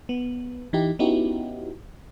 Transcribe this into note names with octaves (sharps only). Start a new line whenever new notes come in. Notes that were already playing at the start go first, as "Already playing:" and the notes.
B3
E3 D#4 E4 G4
B3 C#4 D#4 E4 F#4 G4